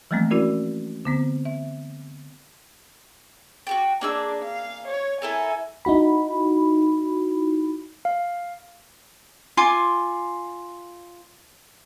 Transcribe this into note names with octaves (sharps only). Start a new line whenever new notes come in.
E3 F3 G3 A3 A#3 C4
C#4 E4 F#4 A#4 D5
D3 B3 C4
E5
F#4 G4 G5
A#3 D4 G#4 E6
F5
C#5
E4 A4 A#4 G#5
D#4 E4 F#4 B5
F5
F4 G#5 C6 D6